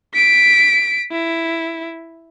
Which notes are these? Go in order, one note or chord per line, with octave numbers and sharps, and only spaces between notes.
B6 D7
E4